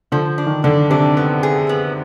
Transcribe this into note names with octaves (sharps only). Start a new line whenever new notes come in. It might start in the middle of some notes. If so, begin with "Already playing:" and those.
D3 F3
D4
D#3
D3 D4
C3 D4
B3
G#4
B3